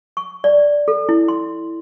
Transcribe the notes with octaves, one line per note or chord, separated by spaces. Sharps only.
C#6
D5
A4
E4
C6